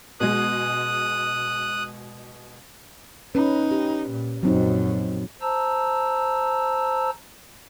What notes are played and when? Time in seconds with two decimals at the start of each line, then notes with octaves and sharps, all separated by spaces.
0.20 B2 G#3 D#6 F#6
3.35 C#4 D#4 B4
3.71 G4
4.09 A#2
4.43 A#1 F#2 F#3 C4 D#4
5.41 C5 A5 A#5 E6